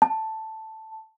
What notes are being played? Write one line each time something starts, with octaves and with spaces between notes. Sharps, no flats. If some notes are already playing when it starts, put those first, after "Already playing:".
A5